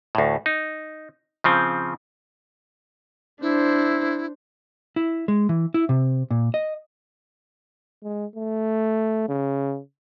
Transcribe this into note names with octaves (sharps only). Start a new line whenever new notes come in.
D2 A2
D#4
C#3 F3 C4
D4 E4 C5
E4
G#3
E3
E4
C3
A#2
D#5
G#3
A3
C#3